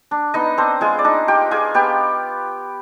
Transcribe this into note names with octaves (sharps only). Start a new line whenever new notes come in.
D4
B3 D#4 D#5
C4 D4 C5
G#3 F4 G#4
D5
D4 D#4 D#5
F4 G4 G5
F4 G#4 G#5
B3 G4 G5